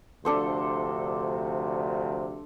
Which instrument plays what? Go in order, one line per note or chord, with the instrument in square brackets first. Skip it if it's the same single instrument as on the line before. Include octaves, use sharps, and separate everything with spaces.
[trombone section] D2 C3 F3 [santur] D4 A4 C5